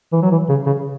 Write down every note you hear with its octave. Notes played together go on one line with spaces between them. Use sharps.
E3
F#3
E3
C#3
C#3